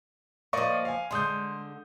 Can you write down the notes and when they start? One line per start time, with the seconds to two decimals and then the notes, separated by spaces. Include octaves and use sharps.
0.53 F3 A#3 D5 D#5 C#6
0.85 F5 G#5
1.11 D3 G#3 C6 D#6 G6